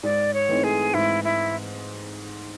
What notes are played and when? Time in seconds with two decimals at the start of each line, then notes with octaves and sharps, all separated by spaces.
0.03 G#2 D5
0.34 C#5
0.49 E3 A3 C4 D#4
0.64 G#4
0.94 G#2 E4
1.24 E4